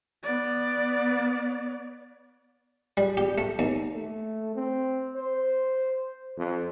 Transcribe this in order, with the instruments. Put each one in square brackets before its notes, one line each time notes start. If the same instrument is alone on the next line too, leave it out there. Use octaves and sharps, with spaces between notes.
[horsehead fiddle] B3 D5
[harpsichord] G3
G4
A3
D#2
[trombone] A3
C4
C5
F2